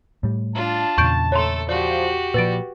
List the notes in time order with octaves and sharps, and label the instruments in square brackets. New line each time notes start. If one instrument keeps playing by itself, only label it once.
[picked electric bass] A2 G3
[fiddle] D4 F4 [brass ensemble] A5
[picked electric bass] E2 A#2 C#3 [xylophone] C#6 G6 D7
[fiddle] A3 A4 [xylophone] C#5 A#5 C6
[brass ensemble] F3 [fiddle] F#4 G4 [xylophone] D5
[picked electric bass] A#2 F3 [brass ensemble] G3 [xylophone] B4 A6 D7